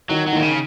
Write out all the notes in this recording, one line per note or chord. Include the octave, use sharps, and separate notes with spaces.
D#3 F#3
F#3
A#2 D#3
C#3